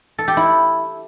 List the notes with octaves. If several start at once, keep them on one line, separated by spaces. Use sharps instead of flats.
A4
G4
E4